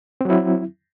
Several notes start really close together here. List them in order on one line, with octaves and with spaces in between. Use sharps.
C4 F#3 E4